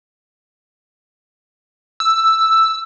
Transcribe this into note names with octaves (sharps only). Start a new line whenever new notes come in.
E6